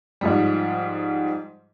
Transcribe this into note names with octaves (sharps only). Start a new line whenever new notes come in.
G#2 F3 G3